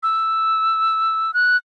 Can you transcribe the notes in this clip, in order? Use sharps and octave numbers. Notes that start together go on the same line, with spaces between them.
E6
F#6